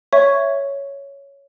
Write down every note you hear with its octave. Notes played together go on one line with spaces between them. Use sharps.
C#5 E5 C#6